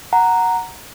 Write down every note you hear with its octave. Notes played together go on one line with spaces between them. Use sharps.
F#5 A#5